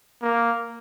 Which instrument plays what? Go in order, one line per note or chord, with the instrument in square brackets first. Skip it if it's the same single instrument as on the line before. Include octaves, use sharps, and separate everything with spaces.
[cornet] A#3